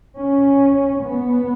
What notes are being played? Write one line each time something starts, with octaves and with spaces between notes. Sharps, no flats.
C#4
B3